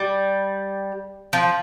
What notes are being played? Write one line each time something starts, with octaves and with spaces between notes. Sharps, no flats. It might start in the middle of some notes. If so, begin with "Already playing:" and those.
Already playing: G3
F3